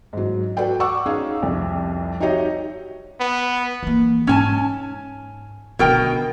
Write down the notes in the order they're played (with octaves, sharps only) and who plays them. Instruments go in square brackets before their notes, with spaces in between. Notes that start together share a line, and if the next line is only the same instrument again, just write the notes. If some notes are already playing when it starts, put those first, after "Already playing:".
[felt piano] G#2 F#3
F#4 A4 B4 D5 G5
F#5 C#6 D6 E6
C#4 D#4 G#4 F5
C2 F2
D#4 F#4 G4 C#5 D#5 E5
[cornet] B3
[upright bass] E3 A#3
[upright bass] G#2 [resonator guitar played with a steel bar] C#4 G#5 A5
[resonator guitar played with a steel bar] B2 A#4 G5 [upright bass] D3 D#3